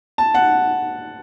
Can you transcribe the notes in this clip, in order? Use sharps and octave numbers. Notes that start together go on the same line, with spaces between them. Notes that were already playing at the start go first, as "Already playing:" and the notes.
A5
F#5